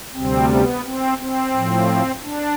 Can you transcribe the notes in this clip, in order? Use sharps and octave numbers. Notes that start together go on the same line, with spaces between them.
D2 C3 G3 C4
B3
C4
C4
A2 F3
D4